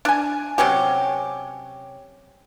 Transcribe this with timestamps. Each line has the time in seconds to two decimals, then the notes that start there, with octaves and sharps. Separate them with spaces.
0.05 D4 G#5
0.58 C3 F#3 C#4 G4